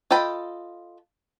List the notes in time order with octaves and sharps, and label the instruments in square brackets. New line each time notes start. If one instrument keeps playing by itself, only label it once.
[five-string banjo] F4 A4 D#5 G5 B5